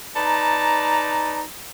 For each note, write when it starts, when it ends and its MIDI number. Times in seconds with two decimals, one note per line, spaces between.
0.16 1.42 63
0.16 1.42 71
0.16 1.42 74
0.16 1.42 81
0.16 1.42 82